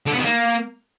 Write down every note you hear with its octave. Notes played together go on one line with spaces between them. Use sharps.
D3
B3
D#3
A#3